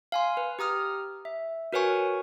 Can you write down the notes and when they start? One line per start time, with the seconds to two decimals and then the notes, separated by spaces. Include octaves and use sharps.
0.12 F5 G#5 C6
0.37 B4
0.59 G4 A#5 D#6 F6
1.25 E5
1.73 F#4 A#4 B4 C#5 G#5 C#6